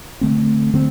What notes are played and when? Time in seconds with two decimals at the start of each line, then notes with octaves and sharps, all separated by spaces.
0.21 D3 A3 C4
0.74 D3 A3 C4